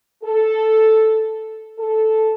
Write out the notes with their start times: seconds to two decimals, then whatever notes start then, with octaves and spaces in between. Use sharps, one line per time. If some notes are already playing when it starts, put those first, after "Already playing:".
0.23 A4
1.79 A4